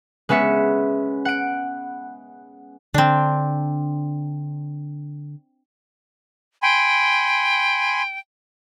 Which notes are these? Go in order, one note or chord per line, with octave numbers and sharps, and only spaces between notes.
G#3 B3 C#4 E5 C#7
F#5 D7
D3 C4 D4
G5 G#5 B5 C6